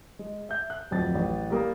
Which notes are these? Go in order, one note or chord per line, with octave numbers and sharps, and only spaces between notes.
G#3
E5 G6
F#6
D1 F2 A6
A1
G3 A#3 D#6